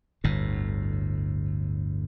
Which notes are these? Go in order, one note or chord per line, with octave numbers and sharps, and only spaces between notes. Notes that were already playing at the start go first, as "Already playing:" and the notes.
G1 D2 A2